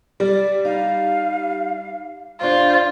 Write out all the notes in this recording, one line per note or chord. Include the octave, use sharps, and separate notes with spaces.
G3 D5
D#4 F5
G2 D4 F4 C5